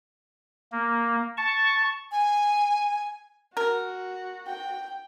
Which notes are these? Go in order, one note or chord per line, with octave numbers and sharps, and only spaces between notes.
A#3
A5 C#6
G#5
F#4 A#4
G5